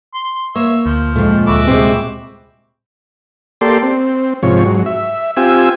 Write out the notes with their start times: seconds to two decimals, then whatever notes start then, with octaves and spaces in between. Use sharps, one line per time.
0.14 C6
0.56 A#3 C#5 E5
0.86 D2 F3
1.16 F2 A#2 G#3 A3
1.47 D2 F#4 E5 B5 D6
1.68 C3 G#3 C4
3.61 A#3 G4 A4 D5 C6
3.83 C4
4.43 G#2 C3 F3 C#5
4.65 G#2 F#3
4.86 E5
5.37 C4 F4 G4 G#5 E6